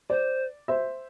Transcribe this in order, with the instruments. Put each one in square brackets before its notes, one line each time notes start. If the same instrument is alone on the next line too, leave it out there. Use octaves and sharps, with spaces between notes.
[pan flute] C5 [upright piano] D5
[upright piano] C5 E5